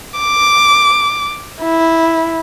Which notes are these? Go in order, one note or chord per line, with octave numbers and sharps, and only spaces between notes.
D6
E4